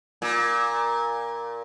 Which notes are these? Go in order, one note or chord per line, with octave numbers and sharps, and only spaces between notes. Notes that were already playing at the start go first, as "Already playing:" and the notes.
A#2